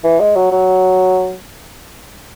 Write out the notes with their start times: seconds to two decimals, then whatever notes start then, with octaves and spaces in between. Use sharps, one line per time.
0.04 E3
0.20 G#3
0.36 F#3
0.52 F#3